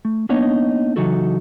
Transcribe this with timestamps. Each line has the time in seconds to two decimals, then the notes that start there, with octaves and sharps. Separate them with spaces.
0.05 A3
0.29 A#3 B3 D4 D#4 C#5 D#5
0.96 C#3 E3 F#3 D#4 F#4 A4